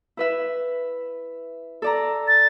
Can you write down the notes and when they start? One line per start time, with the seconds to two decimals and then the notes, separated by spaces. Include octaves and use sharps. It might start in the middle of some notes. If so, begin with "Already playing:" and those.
0.17 E4 B4 E5
1.82 A4 D5 A#5
2.28 A6